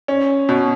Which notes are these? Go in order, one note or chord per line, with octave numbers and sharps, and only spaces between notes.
C#4
B2